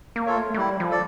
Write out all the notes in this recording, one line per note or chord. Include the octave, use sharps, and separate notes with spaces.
A#3
F4 A4 C#5
A3
A3
G3 E4
F3
A4 D5